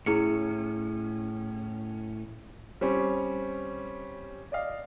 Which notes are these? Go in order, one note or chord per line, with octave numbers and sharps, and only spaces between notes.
A2 C#4 E4 G#4 C#7
G3 C4 C#4
D5 D#5 F5